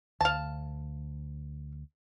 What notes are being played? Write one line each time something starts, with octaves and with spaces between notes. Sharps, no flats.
D2 F5 A5